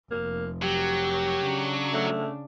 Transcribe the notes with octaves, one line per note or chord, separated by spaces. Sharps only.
F1 A#3
F#3 G4
C#3 D4
A3